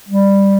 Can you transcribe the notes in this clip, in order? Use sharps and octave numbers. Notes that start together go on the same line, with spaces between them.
G3